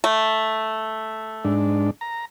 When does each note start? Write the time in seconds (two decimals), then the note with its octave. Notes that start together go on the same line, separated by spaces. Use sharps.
0.04 A3
1.45 G#2 D4
2.01 A#5